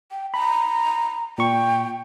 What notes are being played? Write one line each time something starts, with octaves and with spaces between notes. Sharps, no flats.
G5
A#5 B5
A#2 G5 C#6